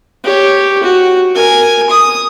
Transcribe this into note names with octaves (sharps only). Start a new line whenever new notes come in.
G4 C#5
F#4
A#4 G#5
D#6